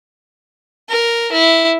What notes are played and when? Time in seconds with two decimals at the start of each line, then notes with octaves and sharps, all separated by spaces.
0.89 A#4
1.32 E4